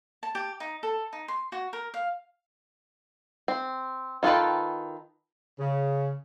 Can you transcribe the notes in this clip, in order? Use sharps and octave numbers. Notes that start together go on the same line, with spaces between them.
A5
G4
D#4
A4
D#4
C6
F#4
A#4
F5
C4
D#3 F4 A4 B4 G5
C#3